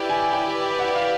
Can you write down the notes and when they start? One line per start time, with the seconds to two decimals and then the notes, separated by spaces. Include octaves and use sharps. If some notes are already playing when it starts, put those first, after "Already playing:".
Already playing: E4 G4 B4 D5
0.10 G#5
0.33 G5
0.79 F#5
0.95 F5